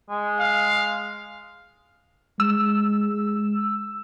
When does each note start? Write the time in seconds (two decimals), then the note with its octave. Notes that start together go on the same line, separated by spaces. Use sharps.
0.10 G#3
0.40 F5
2.40 G#3 E6